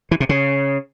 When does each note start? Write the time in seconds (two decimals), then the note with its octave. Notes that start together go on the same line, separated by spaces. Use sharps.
0.11 E3
0.20 C3
0.29 C#3